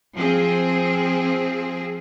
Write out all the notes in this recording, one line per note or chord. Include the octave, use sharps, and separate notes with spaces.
F3 C4 G#4